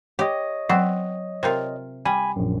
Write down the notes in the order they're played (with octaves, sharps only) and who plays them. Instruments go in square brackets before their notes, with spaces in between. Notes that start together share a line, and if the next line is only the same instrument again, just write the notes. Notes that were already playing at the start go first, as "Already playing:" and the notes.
[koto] G4 [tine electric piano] C#5 D#5
[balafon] F#3 [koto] B3 C4
[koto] C3 F4 [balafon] A#4 C5
[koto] G3 [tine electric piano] G#5 B5
[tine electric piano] A#1 F#2